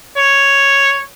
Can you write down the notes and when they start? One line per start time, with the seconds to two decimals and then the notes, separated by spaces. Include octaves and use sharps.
0.16 C#5